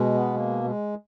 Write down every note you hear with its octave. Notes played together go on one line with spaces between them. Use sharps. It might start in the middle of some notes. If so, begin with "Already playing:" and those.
Already playing: B2 G#3
B3
A#3
G#3